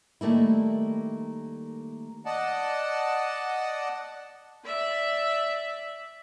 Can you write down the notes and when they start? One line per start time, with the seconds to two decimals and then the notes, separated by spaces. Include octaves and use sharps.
0.21 D#3 G3 A3 A#3 E4
2.26 D5 D#5 F#5 A5
4.65 D5 E5